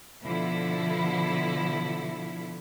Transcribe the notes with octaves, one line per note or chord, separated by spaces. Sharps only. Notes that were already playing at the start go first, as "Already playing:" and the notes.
B2 D3 F3 E4 A4